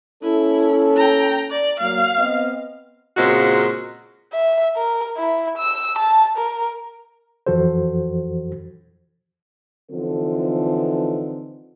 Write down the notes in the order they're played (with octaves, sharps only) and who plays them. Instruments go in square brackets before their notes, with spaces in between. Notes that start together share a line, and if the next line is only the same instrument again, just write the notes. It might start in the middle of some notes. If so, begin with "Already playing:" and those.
[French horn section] A#3 C#4 A4 [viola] E4
[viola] G5 A#5
D5
[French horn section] F#3 A#3 [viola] F5
[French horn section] B3 C4 D#5
[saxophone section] A#2 C#3 G#3 C4 F#4
[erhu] E5
A#4
E4
E6
A5
A#4
[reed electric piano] F2 E3 F3 F#4 A4 C5
[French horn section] D3 E3 F3 C4 D#4 A4